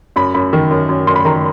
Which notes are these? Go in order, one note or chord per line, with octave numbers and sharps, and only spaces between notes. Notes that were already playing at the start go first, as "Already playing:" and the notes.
F#2 B5
F#2 B5
D#3
F#2
F#2
F#2 C6
B5
D#3 A#5